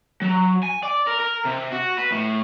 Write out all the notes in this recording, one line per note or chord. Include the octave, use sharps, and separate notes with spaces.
F#3
G#5
D5
A#4
A#4
C3
F#4
B4
A2